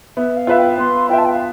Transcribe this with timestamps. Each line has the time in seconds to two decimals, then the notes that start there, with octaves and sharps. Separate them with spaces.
0.17 B3 E5
0.37 F5
0.47 F4 B4 E5
0.58 G5
0.78 B3 C6
1.09 F4 B4 E5 G5
1.18 A5
1.25 G5
1.33 F5